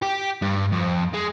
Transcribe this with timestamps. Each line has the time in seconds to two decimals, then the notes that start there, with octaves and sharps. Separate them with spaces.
0.02 G4
0.42 G2
0.72 F2
1.14 G#3